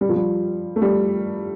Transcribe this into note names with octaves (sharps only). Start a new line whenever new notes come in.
G3
F3
G3
A3
G3